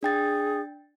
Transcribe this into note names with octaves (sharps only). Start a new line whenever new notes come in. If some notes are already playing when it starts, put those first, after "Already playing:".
D4 G#4 G5 A6